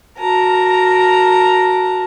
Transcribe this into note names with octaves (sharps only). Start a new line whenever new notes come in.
F#4 A#4 A5 A#5